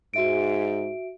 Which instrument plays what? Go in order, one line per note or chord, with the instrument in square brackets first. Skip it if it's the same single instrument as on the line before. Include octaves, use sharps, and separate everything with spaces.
[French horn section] G#2 [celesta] F#4 E5 D7